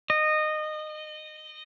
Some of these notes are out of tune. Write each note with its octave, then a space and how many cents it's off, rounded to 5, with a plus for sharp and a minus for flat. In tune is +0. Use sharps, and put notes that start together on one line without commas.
D#5 -20